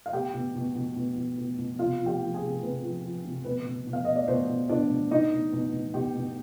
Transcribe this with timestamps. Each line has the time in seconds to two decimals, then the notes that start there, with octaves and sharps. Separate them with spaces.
0.06 F5
0.13 B2 G4 G5
0.34 B2
0.55 B2
0.75 B2
0.96 B2
1.16 B2
1.37 B2
1.58 B2
1.79 C3 F4 F5
2.00 F3
2.06 G4 G5
2.21 F3
2.34 G#4 G#5
2.41 C3
2.62 C3 B4
2.83 F3
3.03 F3
3.25 C3
3.45 B2 B4
3.66 B2
3.87 B2
3.93 F5
4.04 B2 D#5
4.16 D5
4.28 B2 C5
4.49 B2
4.69 B2 D4 D5
4.90 B2
5.11 B2 D#4 D#5
5.32 B2
5.52 B2
5.73 B2
5.94 B2 G4 G5
6.15 B2